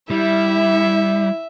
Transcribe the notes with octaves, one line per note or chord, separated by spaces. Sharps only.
G3 E4 E5